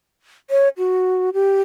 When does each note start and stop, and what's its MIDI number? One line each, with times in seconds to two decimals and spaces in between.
0.50 0.69 73
0.78 1.30 66
1.34 1.61 67